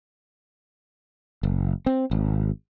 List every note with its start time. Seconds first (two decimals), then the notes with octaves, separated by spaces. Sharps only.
1.43 F#1
1.86 C4
2.11 G#1